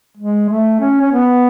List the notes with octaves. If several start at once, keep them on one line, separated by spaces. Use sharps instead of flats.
G#3
A3
C#4
C#4
B3